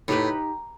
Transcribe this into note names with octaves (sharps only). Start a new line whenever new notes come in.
A2 D#4 G4 B4